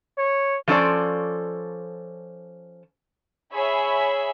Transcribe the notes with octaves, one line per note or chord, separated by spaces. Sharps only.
C#5
F3 A3 C#4 A4 C5 D5
G#4 C#5 E5 G#5 B5